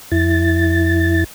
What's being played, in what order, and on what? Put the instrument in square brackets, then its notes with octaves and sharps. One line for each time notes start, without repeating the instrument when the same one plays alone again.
[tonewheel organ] F2 E4 A6